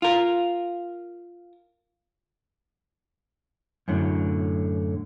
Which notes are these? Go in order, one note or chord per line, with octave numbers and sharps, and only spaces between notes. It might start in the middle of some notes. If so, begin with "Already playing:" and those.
F4 A#4
F#2 A2 D3